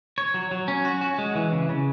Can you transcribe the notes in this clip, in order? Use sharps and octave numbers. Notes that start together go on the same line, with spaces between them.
C#5
F#3
F#3
C#4
F#4
F#4
G#3
E3
C#3
C#3